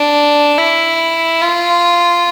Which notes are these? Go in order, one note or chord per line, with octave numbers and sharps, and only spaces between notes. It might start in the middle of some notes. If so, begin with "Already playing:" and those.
Already playing: D4
E4
F4